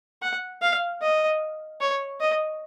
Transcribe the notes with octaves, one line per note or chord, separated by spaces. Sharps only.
F#5
F5
D#5
C#5
D#5